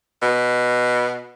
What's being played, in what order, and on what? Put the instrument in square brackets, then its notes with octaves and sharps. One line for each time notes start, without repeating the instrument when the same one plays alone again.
[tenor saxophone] B2